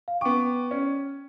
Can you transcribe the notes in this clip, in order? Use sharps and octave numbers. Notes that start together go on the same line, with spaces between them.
F5
B3 G5 C#6 D6
C#4